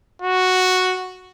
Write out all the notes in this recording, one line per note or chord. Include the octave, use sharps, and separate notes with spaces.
F#4